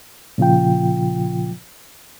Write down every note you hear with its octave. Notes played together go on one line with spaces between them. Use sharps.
A#2 C#3 F3 F4 G5